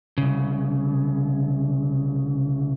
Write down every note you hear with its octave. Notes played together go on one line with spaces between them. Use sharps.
C2 C#3